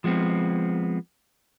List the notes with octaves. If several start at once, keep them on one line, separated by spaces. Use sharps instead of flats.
F3 G#3 B3 C4